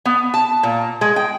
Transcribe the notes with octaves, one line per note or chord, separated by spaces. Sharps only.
B3
A5
A#2
G#3
G5